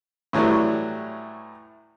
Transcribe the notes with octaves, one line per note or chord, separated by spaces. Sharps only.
A2 E3 F#3 G3 A3